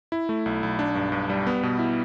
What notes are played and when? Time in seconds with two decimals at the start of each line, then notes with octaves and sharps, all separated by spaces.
0.12 E4
0.29 A3
0.46 B1
0.63 B1
0.79 D4
0.95 G2
1.12 G2
1.30 G3
1.47 B3
1.63 B2
1.79 E4